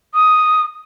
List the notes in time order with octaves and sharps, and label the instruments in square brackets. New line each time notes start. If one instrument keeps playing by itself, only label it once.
[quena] D#6